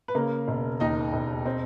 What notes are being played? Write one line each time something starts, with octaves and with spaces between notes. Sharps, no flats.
B4
C#3 A#3 A#4
E1
D#2 D#4 D#5
E1
C4